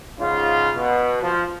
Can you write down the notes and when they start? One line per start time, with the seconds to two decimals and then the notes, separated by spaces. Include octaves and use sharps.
0.20 G#2 C#3 F4
0.76 B2
1.23 F3